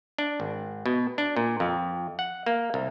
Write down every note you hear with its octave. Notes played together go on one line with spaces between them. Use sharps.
D4
G#1
B2
D4
A#2
F2
F#5
A#3
C2